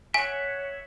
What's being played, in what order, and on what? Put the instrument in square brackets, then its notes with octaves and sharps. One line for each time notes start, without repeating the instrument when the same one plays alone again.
[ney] C#5 [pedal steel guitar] E5 F#5 [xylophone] G#5